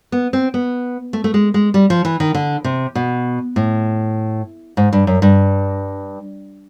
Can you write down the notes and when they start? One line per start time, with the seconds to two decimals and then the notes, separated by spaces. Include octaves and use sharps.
0.12 B3
0.33 C4
0.54 B3
1.13 A3
1.24 A3
1.34 G#3
1.54 G#3
1.74 G3
1.90 F3
2.05 E3
2.20 D#3
2.34 D3
2.64 C3
2.95 B2
3.56 A2
4.77 G#2
4.93 G2
5.07 F#2
5.22 G2